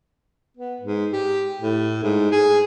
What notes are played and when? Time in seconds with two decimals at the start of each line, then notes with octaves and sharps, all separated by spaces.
0.57 B3
0.81 G#2
1.13 G4
1.62 A2
2.03 G#2
2.32 G#4